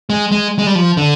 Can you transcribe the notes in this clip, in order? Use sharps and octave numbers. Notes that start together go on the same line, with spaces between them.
G#3
G#3
G#3
G3
F3
D3